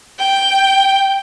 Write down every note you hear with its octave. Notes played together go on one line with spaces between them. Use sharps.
G5